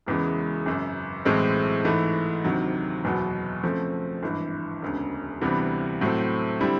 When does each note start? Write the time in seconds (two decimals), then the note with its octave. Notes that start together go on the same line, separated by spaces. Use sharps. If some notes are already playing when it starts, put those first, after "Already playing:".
0.07 E1 E2 C#3 E3 G#3
0.66 G#1 F#2 C#3
1.25 B1 A2 E3 G#3 C4
1.85 G#2 E3 A3
2.44 D2 C3 D#3 F#3
3.04 F#1 E2 B2 F#3 B3
3.63 C#3 F3 A3 C4
4.23 G#1 G2 E3
4.82 E1 D2 C#3
5.41 D2 C3 E3 G3 B3
6.01 A2 F#3 A3 C4
6.60 D3 G3 C4 E4